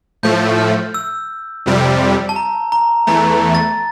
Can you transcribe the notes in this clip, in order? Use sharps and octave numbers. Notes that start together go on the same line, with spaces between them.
A2 F3 A3 G6
F6
E6
F2 C3 G3
A5
A#5
A#5
E2 E3 A3 A#5
A6